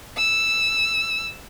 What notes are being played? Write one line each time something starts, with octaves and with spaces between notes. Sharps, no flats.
E6